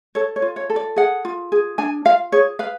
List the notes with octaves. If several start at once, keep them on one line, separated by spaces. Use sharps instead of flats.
A4 C#5
C#5
F4
C#5
A4
D5
G#4 F#5
F4
G#4
D4 G#5
F4 F5
G#4 C#5
B4 F5